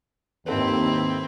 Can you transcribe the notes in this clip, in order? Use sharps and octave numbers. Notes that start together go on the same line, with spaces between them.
G#1 D#2 C4 E4 A4 B4